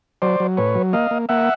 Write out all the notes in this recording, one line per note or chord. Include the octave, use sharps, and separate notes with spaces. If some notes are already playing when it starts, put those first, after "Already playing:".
F#3 C5 D5
F#3
A2 B4 C#5
F#3
A#3 D#5 F5
A#3
A#3 E5 F#5